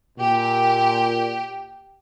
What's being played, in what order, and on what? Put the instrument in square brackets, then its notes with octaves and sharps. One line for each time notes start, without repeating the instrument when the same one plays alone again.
[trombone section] A#2 [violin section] G4